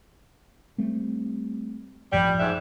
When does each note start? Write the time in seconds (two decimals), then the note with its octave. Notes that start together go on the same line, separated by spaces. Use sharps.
0.78 G3 A3 C4
2.13 A1 F#2 F3 G3
2.39 G#2 D4 E5